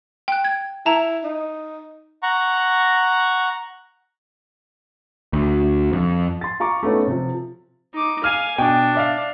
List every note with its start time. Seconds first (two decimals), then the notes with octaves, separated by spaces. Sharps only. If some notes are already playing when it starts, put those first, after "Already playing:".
0.28 G5 F#6
0.44 G#6
0.86 E4 A5 A#5
1.24 D#4
2.23 F#5 A#5 C#6
5.33 D2
5.93 F2
6.41 C6 A6
6.60 F4 A#5 C#6 D6
6.83 A3 B3 C#4 D#4
7.07 C3 F3
7.94 D#4 D6
8.24 F5 G#5 F6 D#7
8.58 B2 D4 G5
8.95 D5 E5 F5